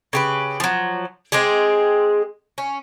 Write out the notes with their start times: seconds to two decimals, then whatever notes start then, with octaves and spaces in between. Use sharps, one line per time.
0.13 C#3 G4 B4
0.60 F3 F#3
1.32 G#3 C4 G4 G#4
2.58 C#4